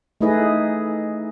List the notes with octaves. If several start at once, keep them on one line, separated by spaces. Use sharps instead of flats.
A3 D#4 E4 G#4 B4 D#5